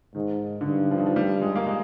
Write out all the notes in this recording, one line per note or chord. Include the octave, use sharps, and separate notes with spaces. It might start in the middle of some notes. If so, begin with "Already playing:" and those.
G#2 D#3
D3
G2 D#3
F3
D#3
F3
G3
G#3
A#3
G#3